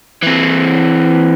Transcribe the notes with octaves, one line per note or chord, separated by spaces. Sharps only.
E3 C4